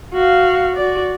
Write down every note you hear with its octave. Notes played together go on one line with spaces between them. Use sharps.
F#4 F5
F#4 D5